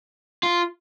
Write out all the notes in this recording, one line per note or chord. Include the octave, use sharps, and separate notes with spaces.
F4